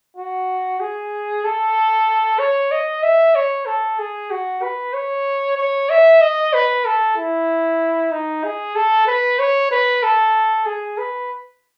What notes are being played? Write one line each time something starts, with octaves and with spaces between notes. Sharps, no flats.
F#4
G#4
A4
C#5
D#5
E5
C#5
A4
G#4
F#4
B4
C#5
C#5
E5
D#5
B4
A4
E4
D#4
G#4
A4
B4
C#5
B4
A4
G#4
B4